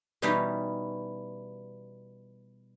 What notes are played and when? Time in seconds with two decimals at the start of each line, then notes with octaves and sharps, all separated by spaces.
0.22 B2 E3 G3 B3 C#4 D#4